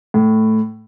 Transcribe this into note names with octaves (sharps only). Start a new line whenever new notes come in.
A2